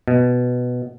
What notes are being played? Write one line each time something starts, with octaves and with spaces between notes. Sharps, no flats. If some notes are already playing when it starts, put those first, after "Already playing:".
B2